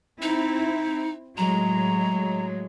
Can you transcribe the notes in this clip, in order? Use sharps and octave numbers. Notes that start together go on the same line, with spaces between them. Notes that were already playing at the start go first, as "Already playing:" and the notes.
C4 D#4 E4
A2 F#3 G#3 A#5